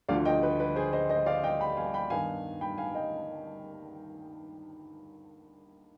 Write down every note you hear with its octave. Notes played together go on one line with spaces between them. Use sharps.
D2 D3 F3 D5 F5
D#5 G5
B4
B4
G#4 C5
C5 D#5
C5 D#5
D5 F5
D#5 G5
G5 B5
F5 G#5
G5 B5
G2 D#3 B3 D#4 F5 G#5
G5 B5
F5 G#5
D#5 G5